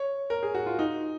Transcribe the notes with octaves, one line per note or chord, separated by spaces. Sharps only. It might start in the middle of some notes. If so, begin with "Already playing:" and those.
Already playing: C#5
A#4
G#4
F#4
F4
D#4